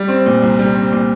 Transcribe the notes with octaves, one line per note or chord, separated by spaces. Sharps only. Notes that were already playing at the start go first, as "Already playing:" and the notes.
Already playing: G3
C4
A#2
C2
G3
C4
A#2